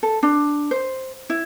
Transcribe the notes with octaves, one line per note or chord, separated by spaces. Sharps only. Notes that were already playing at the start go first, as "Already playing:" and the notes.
A4
D4
C5
E4